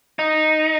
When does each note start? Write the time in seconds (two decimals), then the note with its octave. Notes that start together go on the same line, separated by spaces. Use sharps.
0.19 D#4